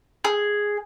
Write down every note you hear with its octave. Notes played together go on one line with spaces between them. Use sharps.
G#4